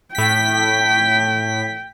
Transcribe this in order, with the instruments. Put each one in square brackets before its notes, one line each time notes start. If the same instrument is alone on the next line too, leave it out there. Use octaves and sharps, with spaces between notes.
[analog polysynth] A2 B6 [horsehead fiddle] G5